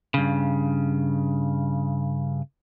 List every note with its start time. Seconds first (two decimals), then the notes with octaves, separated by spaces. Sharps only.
0.14 G2 C#3